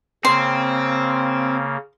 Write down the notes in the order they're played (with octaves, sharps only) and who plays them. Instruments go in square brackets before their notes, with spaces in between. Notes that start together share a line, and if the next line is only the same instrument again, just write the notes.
[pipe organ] C#3 A#3 [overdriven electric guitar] C4 [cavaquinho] C6